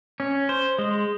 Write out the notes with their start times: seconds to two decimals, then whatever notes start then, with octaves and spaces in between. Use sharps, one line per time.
0.20 C#4
0.49 C5
0.79 G#3